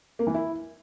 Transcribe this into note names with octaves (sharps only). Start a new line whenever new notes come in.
A#3
E3
E4